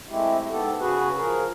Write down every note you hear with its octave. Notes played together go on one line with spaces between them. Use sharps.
G#3 A3 C4 E4 G4
G#2 B3 G4 A4
C#3 F#4 G#4 B4
F3 G#4 A#4